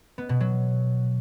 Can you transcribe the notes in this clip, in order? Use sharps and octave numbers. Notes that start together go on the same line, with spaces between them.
B3
B2
F#3